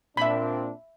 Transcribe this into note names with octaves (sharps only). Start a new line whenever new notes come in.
A#2 C4 D4 E5 B5